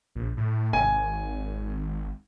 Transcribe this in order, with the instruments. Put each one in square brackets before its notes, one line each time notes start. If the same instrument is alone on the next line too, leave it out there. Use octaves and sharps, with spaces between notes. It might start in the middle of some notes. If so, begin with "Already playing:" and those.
[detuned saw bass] A#1
A2
[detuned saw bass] G#1 [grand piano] G#5